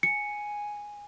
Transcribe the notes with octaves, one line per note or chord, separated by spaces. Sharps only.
G#5 C#7